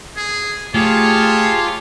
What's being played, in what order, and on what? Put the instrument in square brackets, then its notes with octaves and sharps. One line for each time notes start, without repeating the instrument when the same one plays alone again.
[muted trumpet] G#4
[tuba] A3 [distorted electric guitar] F4 [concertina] G4 G#4 A5 [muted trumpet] C#5